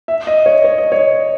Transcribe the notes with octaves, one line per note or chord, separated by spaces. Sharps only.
E5
D#5
C#5
C#5
D#5
C#5